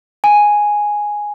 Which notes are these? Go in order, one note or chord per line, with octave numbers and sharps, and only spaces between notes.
G#5